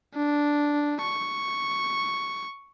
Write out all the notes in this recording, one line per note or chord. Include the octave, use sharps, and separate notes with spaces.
D4
C#6